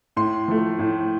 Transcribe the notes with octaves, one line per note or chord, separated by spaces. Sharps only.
A2 C6
F3 A3
A2